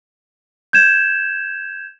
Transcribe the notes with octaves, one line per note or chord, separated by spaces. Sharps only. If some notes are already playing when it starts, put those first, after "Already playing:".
G6 G#6 E7